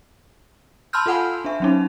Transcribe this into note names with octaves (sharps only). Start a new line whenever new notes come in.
A5 B5 C6 E6 F6 G6
F4 A4 F5 F#5 G#5 B5
D4 E5
F#3 C#4 D#4